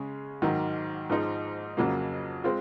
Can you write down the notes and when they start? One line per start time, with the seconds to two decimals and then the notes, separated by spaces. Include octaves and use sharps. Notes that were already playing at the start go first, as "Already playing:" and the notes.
Already playing: C#3 G#3 C#4 G#4
0.42 G#2 D#3 F#3
1.10 G#2 F3 G#3 D#4
1.77 F2 C#3 F#3 A#3
2.44 G#3 C4 F4